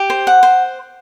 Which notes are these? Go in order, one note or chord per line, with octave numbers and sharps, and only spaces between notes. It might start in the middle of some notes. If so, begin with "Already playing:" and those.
Already playing: G4
C5
F#5
C5